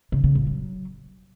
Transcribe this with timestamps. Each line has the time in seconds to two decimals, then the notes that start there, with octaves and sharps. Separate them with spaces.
0.12 C#3
0.24 C#3
0.35 A#2
0.47 F#3